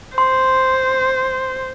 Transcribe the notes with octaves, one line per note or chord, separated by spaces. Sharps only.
C5 C6